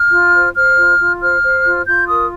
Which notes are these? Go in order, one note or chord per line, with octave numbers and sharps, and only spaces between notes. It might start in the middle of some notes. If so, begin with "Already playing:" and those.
Already playing: F6
F4
C5
C5 F6
F4
F4
C5 F6
C5
F4
F4 G6
A#4 D#6